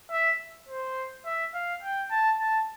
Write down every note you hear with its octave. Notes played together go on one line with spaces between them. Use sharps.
E5
C5
E5
F5
G5
A5
A5